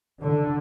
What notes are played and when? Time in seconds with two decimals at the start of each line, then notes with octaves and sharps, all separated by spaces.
0.21 D3